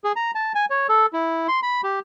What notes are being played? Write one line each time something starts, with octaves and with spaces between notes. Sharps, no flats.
G#4
A#5
A5
G#5
C#5
A4
E4
C6
B5
G4